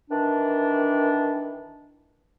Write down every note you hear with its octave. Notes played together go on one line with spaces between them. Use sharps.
D#3 E3 D4